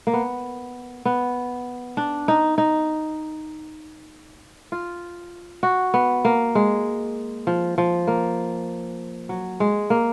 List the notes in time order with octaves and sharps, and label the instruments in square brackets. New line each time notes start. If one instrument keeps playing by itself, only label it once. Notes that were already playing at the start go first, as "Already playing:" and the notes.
[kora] A#3
B3
B3
D4
D#4
D#4
F4
F#4
B3
A#3
G#3
F3
F3
A#3
F#3
G#3
A#3